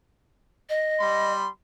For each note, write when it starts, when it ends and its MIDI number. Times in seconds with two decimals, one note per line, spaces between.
0.69 1.32 75
1.00 1.48 55
1.00 1.48 83
1.00 1.48 84